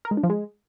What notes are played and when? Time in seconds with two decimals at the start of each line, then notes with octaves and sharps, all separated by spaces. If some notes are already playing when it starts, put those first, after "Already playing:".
0.05 A#4
0.11 G#3
0.17 D4
0.23 F3
0.30 G#3